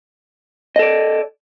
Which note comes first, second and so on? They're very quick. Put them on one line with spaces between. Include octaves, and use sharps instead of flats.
D#5 A4 D5